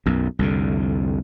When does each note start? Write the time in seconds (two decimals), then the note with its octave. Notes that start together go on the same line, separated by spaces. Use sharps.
0.06 B1 F#2
0.39 C2 F2 D3